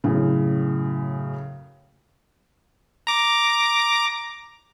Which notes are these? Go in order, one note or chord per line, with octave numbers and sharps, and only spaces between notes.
F#2 A2 C#3
A#5 D6